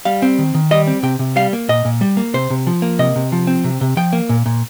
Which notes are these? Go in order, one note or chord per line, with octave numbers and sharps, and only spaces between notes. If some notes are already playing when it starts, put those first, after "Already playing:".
G3 F5
C4
D#3
D#3
G3 D#5
C4
C3 G5
C3
G3 F5
A#3
A#2 D#5
A#2
G3
A#3
C3 C5
C3
F3
A#3
C3 D#5
C3
F3
C4
C3
C3
F3 G5
A#3
A#2
A#2